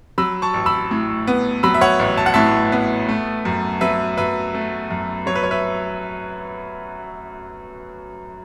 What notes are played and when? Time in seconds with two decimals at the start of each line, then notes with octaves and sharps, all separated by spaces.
0.18 F#3 B5 E6
0.42 A5 C#6
0.54 A1
0.66 B5 E6
0.91 A2
1.27 B3
1.63 F#3 B5 E6
1.74 E5
1.81 C#5 F#5
1.99 A1
2.17 A5
2.26 F#5
2.34 A2 E5 A5
2.72 B3
3.09 A3
3.45 F#2
3.81 F#3 B4 E5
4.17 F#2 B4 E5
4.55 A3
4.90 F#2
5.26 F#3 C#5
5.35 B4
5.43 C#5
5.51 B4 E5